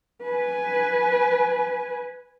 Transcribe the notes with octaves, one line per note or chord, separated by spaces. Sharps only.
B4 G#5